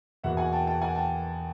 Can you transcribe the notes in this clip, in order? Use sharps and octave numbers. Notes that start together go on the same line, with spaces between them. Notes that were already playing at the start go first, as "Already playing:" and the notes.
E2 B2 F#3 A#3 E5 F#5
F#5 G#5
G5 A5
G5 A5
F#5 G#5
G5 A5